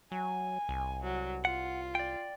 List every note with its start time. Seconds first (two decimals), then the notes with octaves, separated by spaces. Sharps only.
0.12 F#3 G#5
0.69 C2
1.03 F#3
1.45 F4 F#5
1.95 D5 G5